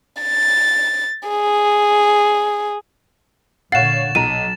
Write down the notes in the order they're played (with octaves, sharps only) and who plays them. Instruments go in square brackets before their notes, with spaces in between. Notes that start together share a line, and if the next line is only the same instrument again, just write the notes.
[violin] A6
G#4
[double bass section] A#2 D3 [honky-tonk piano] C#5 F5 F#5 [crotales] A6 E7 [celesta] C7
[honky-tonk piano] B1 A#5 [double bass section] F#3 [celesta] D#7